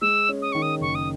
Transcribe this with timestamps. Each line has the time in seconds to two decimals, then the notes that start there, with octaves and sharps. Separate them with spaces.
0.01 G#3 E6
0.29 C#4
0.42 D#6
0.52 D#3 C#6
0.62 D#6
0.81 F#1 C#6
0.95 D#6